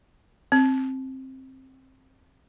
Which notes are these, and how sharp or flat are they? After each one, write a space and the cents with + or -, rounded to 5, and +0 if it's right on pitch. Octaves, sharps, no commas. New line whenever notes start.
C4 +15